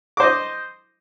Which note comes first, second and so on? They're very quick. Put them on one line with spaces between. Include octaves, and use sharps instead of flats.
D6 C5 D#5